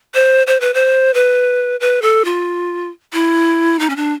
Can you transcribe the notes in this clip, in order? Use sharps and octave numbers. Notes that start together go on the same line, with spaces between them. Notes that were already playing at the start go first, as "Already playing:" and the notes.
C5
C5
B4
C5
B4
B4
A4
F4
E4
D#4
C#4
D4